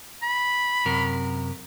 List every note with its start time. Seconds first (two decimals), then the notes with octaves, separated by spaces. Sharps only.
0.22 B5
0.85 F#2 C3 A#4